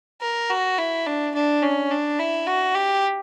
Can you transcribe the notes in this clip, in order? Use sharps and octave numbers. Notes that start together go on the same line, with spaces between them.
A#4
F#4
E4
D4
D4
C#4
D4
E4
F#4
G4